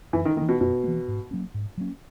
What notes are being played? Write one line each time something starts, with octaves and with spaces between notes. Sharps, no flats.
F#2 E3
D#3
D#3 A#3
E3
B2
F#2 B2
E3 A#3
G#2
F#3 A#3 C#4
G#2
F#3 A#3 C#4